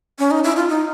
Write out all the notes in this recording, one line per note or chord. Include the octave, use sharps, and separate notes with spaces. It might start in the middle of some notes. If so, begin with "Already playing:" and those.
C#4
D#4
E4
F4
D#4